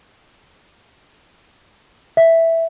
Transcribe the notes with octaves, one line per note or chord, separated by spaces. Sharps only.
E5